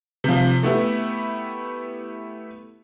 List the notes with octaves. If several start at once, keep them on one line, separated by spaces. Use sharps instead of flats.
C3 F3
A3 B3 E4 G4